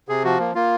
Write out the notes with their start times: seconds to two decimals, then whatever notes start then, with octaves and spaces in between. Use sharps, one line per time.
0.08 C3 G#4
0.24 F3 F#4
0.39 A#3
0.55 A#3 F4